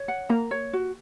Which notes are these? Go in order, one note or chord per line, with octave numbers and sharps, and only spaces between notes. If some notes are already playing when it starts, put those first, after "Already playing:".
Already playing: C#5
F#5
A#3 A#5
C#5
F#4